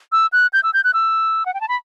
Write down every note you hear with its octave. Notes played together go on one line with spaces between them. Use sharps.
E6
F#6
G6
E6
G6
F#6
E6
F#5
G5
A5
B5